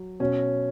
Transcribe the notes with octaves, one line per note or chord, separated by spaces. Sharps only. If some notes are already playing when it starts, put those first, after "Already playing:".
Already playing: F#3
B2 C#4